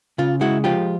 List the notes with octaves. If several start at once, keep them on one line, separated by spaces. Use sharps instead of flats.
C#3 F4
G#3 E4 F#4
F3 F4 G4